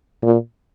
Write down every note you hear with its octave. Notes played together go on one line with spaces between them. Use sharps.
A#2